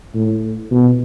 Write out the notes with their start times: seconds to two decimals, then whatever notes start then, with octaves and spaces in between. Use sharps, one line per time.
0.15 A2
0.71 B2